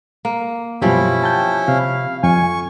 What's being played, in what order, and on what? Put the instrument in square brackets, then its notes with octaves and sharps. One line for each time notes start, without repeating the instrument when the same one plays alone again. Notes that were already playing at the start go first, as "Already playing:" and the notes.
[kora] A#3
[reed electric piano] F#2 B2 [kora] F3 G3 G4 [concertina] C#4 E4
[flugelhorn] G5 [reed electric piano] A5 G6
[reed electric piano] C3 [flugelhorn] F5
[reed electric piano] F2 [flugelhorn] G#5 [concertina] C#6